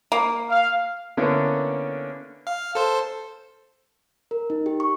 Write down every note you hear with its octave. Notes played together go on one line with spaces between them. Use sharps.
A#3
F5
D3 A#3 B3 C#4 D4 E4
F5
A4 C5
A#4
D#4
G4
C#6